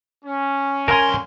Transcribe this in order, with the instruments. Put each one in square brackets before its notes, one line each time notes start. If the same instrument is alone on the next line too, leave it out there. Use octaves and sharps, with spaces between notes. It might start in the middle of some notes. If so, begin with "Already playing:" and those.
[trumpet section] C#4
[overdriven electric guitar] C2 C6 [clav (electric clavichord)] A#4 A#5 [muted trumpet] G#5